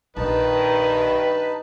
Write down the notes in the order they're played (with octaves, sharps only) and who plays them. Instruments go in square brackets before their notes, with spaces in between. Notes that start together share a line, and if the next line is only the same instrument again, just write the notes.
[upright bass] A#1 [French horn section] G2 D#3 [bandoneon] D#4 A5 [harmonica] B4 D#5